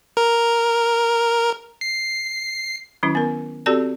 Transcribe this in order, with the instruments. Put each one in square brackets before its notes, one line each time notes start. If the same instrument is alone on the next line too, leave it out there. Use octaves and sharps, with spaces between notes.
[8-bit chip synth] A#4
C7
[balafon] D#3 F#3 C#4 E4
B3 A#4
C4 F#4 G4 A4 D5 A5